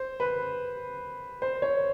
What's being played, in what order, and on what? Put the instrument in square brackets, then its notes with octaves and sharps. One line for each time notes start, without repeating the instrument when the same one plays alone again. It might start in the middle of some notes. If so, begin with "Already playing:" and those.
Already playing: [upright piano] C5
B4
C5
C#5